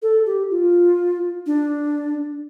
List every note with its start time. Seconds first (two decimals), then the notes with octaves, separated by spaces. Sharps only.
0.02 A4
0.26 G4
0.50 F4
1.46 D4